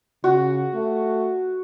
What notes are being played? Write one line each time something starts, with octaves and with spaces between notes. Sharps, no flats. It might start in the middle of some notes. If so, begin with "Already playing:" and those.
C#3 F#4
A3